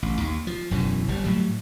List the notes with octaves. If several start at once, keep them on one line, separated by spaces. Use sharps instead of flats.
A1
D#2
F3
E1 F#2 B2 E3
G1 G3
A2 F#3 G3